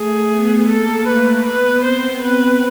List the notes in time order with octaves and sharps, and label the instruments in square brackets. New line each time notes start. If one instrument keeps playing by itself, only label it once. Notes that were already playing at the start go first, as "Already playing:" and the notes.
Already playing: [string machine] A3 [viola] G#4
[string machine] B3
[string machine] A#3 [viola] A4
[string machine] A3 [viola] B4
[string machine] B3 [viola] B4
[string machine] C4 [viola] C5
[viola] B4